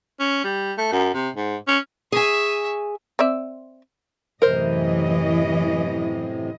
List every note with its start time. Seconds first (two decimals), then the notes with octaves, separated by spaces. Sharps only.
0.20 C#4
0.44 G3
0.78 A3
0.92 F#2
1.14 C3
1.36 G#2
1.68 C#4
2.12 G#4 E5 G#5 C#6
3.19 C4 D5 E5
4.42 F#2 A2 C3 E3 A#4 C5 D#5